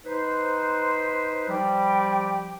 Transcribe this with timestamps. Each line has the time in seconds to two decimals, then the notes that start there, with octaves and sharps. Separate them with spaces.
0.05 D#4 B4 C5
1.48 F3 G3 G4